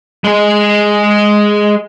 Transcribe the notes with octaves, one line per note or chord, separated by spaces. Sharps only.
G#3 G#4